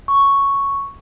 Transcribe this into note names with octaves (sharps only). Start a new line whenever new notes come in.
C#6